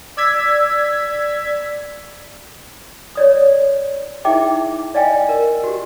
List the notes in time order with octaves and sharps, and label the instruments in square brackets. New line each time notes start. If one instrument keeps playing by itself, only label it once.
[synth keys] D5 E6 G#6 B6
[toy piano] C#5 D5 D#6
D#4 E4 G#4 E5 G5 D6
D5 D#5 F5 G5 G#5
A#4
F#4 G4